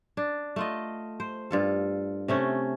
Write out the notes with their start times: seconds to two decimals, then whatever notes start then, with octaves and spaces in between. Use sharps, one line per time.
0.17 D4
0.56 A3 F4 D#5
1.20 C5
1.51 G2 F4 A4
2.28 C3 A3 C#4